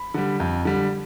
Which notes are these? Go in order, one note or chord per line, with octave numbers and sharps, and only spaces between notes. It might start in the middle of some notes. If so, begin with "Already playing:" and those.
Already playing: B5
D3 G3
F2
D3 G3